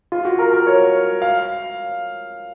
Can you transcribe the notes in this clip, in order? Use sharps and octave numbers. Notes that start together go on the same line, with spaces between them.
F4
F#4
A#4
A#4
C#5
F5